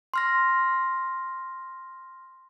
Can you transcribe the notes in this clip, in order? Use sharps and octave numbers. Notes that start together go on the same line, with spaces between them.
C6 F6 A#6